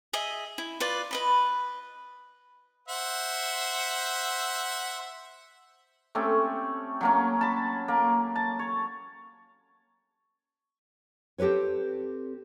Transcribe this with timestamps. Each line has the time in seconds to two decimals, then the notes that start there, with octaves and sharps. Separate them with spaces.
0.13 G#4 D#5 E5
0.58 E4
0.80 F4 B4 D5
1.11 B4 D#5 B5
2.88 C5 E5 F#5
6.15 A3 C4 C#4 G4
7.01 F#3 A#3 C#4
7.41 A5 B5
7.88 A#3
8.36 A5
8.59 C#5
11.38 C4 G4 A4 B4 C#5